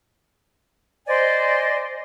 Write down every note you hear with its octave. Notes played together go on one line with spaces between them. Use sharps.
C5 D5 D#5 G#5